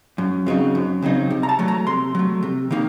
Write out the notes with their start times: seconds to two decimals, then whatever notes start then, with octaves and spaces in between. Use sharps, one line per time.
0.18 F#2
0.46 C#3 F#3 C4 D#4
0.75 F#2
1.02 C#3 F#3 C4 D#4
1.30 C3
1.43 A#5
1.49 A5
1.59 F#3 A3
1.68 A#5
1.87 C3 C6
2.15 F#3 A3
2.43 C3
2.71 D#3 A#3 D#4